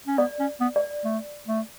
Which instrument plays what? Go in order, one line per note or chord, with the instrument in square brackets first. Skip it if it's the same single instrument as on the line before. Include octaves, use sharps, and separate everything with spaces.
[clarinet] C#4
[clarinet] B3 [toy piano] D5
[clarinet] C#4
B3
[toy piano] D5
[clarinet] A3
A3